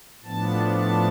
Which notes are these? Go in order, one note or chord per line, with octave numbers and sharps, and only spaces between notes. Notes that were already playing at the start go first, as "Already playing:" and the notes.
A2 F3 B3 D4 A5
A5